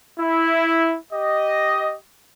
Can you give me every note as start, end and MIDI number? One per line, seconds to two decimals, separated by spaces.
0.20 0.96 64
1.12 1.97 67
1.12 1.97 75